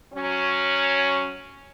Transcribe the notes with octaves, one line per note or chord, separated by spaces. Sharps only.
F#3 C#4